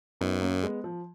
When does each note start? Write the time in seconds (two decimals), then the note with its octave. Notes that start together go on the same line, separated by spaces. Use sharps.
0.21 F#2 B3 D#4
0.41 A#3 C#4
0.63 G#3 B3
0.84 F3